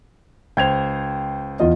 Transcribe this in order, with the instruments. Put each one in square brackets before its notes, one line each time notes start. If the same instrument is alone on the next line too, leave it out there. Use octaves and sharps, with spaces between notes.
[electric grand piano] C#2 C5 [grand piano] G5 G#6 F7
[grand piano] E2 F4 D#5